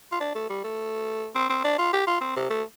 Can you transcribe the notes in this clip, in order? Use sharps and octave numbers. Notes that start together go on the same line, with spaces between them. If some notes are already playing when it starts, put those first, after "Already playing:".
F4
D4
A3
G3
A3
C4
C4
D4
F4
G4
F4
C4
C3
A3